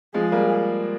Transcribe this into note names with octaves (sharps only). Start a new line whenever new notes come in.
F3 G#3 G#4
G3 A#3